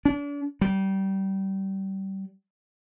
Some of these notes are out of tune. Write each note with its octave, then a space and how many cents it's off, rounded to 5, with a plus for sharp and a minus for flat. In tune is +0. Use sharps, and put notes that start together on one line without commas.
D4 -40
G3 -25